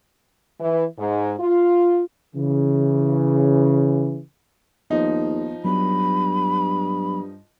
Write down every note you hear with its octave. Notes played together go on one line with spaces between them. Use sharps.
E3
G#2
F4
C#3 E3
D#2 F3 B3 D#4
G2 F#3 B3 B5